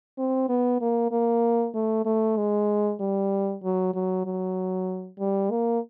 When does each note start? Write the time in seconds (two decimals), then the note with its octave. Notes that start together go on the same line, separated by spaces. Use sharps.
0.18 C4
0.49 B3
0.81 A#3
1.12 A#3
1.75 A3
2.06 A3
2.37 G#3
3.00 G3
3.63 F#3
3.95 F#3
4.26 F#3
5.19 G3
5.51 A#3